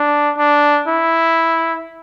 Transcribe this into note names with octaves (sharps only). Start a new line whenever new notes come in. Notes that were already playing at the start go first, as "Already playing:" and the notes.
Already playing: D4
D4
E4